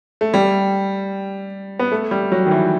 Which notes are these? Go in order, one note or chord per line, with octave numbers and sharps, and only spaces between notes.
A3
G3
B3
A3
G3
F#3
D#3
E3